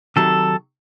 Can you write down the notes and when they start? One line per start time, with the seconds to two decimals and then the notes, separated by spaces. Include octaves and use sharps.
0.16 C3 D#3 F#3 A4